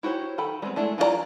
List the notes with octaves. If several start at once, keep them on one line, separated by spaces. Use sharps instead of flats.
E4 F#4 G4 C5 C#5
D#3 A4 G5 B5
G3 G#3 B3 C4
G#3 A3 D4 E4
E3 F4 F#4 D5 A#5